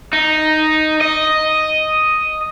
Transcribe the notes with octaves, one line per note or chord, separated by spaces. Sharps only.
D#4
D#5